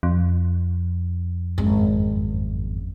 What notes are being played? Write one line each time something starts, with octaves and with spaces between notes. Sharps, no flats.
F2
G#1 F#2